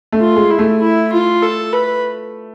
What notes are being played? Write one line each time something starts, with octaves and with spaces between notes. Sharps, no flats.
A3
F4
G#3
E4
A3
E4
F4
A4
B4